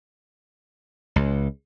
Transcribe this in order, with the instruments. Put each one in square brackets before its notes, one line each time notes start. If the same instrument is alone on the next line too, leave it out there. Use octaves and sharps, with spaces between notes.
[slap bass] C#2